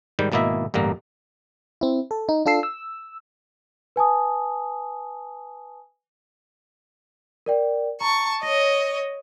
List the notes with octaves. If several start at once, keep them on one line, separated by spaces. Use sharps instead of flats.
G#2 D#3 G3 G5
G#1 B2 A#3 E4 D#5 E5
A1 G2 D3 A#3 A#5
C4 E4
A4
D#4
D4 F4 A4 E6 C7
E6
B4 G#5 A5 D#6
A#4 D5 G5
A5 A#5 C#6
C#5 D#5 A#6